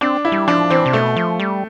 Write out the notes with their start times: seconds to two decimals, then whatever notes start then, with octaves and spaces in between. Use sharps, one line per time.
0.01 C4 D4
0.25 E4
0.32 G3
0.48 F3 D4
0.70 E3 C4
0.86 C3
0.93 B2 A3
1.16 F3
1.40 G3